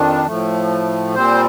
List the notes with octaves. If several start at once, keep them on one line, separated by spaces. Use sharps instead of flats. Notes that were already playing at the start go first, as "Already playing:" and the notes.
Already playing: F2 D#3 D4
A2 F3 A3
A#2 G3 C4 C5